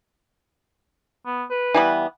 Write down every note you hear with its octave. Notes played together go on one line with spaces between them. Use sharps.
B3
B4
E3 G3 B3